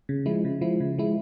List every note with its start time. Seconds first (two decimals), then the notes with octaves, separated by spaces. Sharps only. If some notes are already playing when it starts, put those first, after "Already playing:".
0.09 C#3
0.26 F3 G#3 E4
0.45 C#3
0.61 F3 G#3 E4
0.80 C#3
0.98 F3 G#3 E4